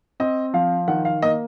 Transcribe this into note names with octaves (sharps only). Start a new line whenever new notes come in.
C4 D#5
F3 F5
D#3 F#5
F5
A#3 D#5